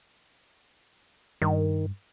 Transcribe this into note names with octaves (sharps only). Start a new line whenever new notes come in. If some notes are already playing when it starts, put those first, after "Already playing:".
G2 D#3